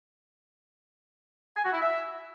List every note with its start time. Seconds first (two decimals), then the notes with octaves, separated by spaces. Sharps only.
1.57 G#5
1.65 F#4
1.73 E4
1.81 E5